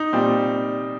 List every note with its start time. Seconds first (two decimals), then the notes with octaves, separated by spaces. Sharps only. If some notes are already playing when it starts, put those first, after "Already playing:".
Already playing: D#4
0.13 A#2 G3 C4